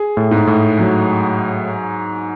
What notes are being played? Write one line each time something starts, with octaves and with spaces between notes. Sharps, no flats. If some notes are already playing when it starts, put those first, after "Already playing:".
Already playing: G#4
A2
G#2
A2
F#3